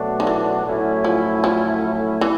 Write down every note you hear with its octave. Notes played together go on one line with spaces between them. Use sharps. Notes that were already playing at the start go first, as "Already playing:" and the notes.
Already playing: B2 F#3 A3 D4 F#4
D#3
E3
A2 F#3 A3 C#4 E4
F3
F3
E3